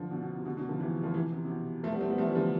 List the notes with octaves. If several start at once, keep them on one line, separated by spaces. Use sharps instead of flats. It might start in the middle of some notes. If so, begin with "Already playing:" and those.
Already playing: D3 F3
B2 D3
B2
C3
B2 D3
B2 D3
D3 F3
C3 E3
F3
C3 E3
C3
C3
B2
F3 A3
G3 B3
A3 C4
G3 B3
F3 A3
E3 G3
D3 F3
C3